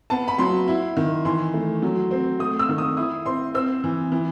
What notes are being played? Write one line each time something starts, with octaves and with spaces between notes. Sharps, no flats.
B3 A5
B5
F#3 C6
E4
D#3
E3 C6
A3
F#3
C4
A3 D#6
E6
D#3
D#6
E4 D#6
C4 C6
C4 E6
E3
E3